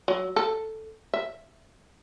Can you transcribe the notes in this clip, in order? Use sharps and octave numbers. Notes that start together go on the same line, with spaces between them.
F#3
A4
E5